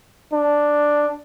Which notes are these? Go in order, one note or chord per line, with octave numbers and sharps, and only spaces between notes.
D4